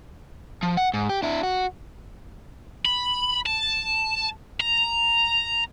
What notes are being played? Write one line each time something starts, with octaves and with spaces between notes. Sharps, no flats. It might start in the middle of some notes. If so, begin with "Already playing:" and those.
F3
F#5
G#2
G4
D4 E4
F#4
B5
A5
A#5